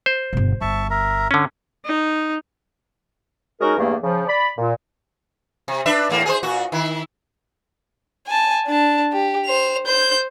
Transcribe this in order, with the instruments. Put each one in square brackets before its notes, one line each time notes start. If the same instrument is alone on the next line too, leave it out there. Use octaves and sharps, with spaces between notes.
[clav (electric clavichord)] C5
[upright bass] G1 B2
[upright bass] G1 [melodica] E5 A5 C#6
[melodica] A#4 E5 A#5
[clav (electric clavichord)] D3 C#4
[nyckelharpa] D#4
[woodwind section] G#3 C#4 D#4 F#4 A#4
E2 G2 A3 A#3 G#4
C#3 F3
D5 B5
A#2
[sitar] C3
D4 B4 E5
E2 A2 A#3
G#4 A#4 C5
A#2 F#4
D#3 E4
[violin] G#5 A5
D4 A5
G4
C5 F7
C5 G6